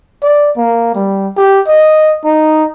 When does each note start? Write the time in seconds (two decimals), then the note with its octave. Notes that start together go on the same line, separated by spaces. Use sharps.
0.23 D5
0.57 A#3
0.95 G3
1.37 G4
1.67 D#5
2.24 D#4